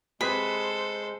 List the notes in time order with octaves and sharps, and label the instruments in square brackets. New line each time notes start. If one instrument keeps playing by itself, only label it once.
[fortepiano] C3 G#4 B4 [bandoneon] G#3 [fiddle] A4 C5 [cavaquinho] B5